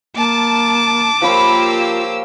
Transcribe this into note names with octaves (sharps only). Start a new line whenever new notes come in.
A#3 A5 D6
F3 A#3 F4 G4 C#5 B5 E6